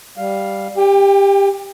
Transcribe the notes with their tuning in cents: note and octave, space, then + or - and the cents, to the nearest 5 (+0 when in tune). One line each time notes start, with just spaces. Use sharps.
G3 +0 F5 +0
G4 +15 G5 +45